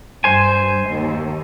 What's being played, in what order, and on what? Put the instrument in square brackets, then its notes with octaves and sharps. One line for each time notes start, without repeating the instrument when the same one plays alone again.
[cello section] G2 [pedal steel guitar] C5 G#5
[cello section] D#2